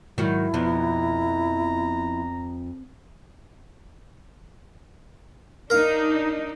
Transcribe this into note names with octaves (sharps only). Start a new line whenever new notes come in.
G#2 D#3 F#3 E4 F#4
F2 B2 F3 B3 A#5
D4 D#4 A#4 F5